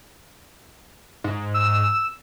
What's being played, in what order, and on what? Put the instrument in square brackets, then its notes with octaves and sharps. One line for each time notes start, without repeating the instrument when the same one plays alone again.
[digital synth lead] G#2
[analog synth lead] E6